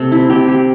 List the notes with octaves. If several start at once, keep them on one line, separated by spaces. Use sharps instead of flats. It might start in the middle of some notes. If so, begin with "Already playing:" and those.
Already playing: C3 A4
E4
C3 G4
G4